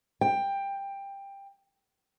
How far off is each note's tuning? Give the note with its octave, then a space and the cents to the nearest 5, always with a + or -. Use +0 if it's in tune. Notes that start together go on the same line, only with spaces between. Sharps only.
G5 +15